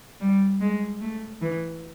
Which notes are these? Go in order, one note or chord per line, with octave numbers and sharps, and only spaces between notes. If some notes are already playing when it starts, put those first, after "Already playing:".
G3
G#3
A3
E3